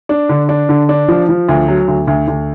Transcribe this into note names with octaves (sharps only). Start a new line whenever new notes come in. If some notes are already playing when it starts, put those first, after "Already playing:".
D4
D3
D4
D3
D4
F3
F3
D2
F#3
D2
D2
D2